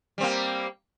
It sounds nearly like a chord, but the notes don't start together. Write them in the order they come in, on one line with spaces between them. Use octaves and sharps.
G3 C4 A#3